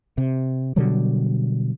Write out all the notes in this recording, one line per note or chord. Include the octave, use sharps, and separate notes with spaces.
C3
B2 D3 F#3 G3